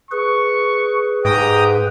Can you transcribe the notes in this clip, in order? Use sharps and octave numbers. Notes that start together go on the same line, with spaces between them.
G#4 B4 C#6
G#2 G4 G5 A#5 D#6